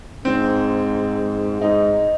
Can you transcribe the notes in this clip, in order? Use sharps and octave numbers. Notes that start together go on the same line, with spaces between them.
G#2 C4
G#2 D#4